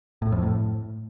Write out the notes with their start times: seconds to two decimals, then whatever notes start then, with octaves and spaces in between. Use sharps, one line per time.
0.22 A2
0.32 F2
0.43 A2